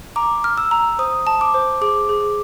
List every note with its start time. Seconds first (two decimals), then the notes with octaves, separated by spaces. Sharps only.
0.16 A#5 D6
0.44 F6
0.57 E6
0.71 A#5
0.99 C5 D#6
1.27 A5
1.41 D6
1.54 C5
1.81 G#4 D6
2.09 G#4